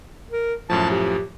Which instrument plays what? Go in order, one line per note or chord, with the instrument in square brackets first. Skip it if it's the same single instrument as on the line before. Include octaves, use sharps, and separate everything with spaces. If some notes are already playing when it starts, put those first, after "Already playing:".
[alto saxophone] A#4
[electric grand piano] F#2 A2 F3 [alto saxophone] A5
[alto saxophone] G4